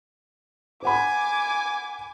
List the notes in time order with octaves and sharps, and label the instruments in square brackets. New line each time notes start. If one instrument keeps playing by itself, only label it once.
[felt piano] C5 F#5 B5 [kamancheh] G#5 D6